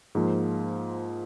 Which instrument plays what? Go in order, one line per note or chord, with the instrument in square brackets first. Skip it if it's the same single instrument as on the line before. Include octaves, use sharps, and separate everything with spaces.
[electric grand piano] G#2 F3 A#3